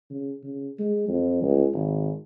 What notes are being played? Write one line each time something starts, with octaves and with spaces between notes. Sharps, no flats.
C#3
C#3
G#3
F2
C#2
G#1